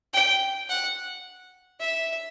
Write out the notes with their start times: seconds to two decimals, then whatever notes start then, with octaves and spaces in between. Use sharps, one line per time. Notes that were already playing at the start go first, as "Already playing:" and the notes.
0.14 G5
0.69 F#5
1.80 E5